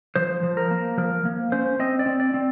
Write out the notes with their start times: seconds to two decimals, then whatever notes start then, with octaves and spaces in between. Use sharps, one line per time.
0.15 F3 C5
0.43 F3
0.57 A#4
0.71 A#3
0.98 F3 A#4
1.25 A#3
1.52 C#4 C5
1.79 C4 D#5
1.99 D5
2.06 C4
2.20 D5
2.34 C4